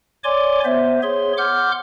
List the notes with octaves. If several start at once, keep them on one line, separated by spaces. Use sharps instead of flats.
C#5 D5 G#5 C6 D6
B3 C5 E5
G#4 C#5 C6
F#5 C6 D6 F6 G6